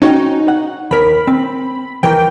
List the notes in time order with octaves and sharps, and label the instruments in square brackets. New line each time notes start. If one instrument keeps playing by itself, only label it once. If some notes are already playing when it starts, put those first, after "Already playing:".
[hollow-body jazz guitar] C#4 F#4 G5 [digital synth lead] D#4
[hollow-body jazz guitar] F#5
[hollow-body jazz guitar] D#2 A#4 [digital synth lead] B5
[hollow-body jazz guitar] C4
[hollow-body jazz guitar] D#2 E3 A#4 [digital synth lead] G5